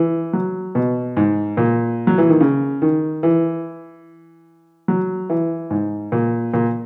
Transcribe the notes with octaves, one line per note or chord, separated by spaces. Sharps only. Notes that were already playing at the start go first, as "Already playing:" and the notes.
Already playing: E3
F#3
B2
G#2
A#2
F#3
E3
D#3
C#3
D#3
E3
F#3
E3
G#2
A#2
A#2